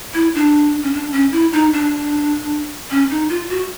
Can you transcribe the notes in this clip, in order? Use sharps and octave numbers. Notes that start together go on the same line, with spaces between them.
E4
D4
C#4
D4
C#4
E4
D#4
D4
C#4
D#4
F4
F#4